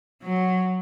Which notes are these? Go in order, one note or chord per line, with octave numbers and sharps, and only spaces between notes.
F#3